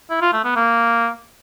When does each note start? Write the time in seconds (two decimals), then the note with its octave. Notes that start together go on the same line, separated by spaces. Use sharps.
0.10 E4
0.21 F4
0.33 A3
0.44 B3
0.56 A#3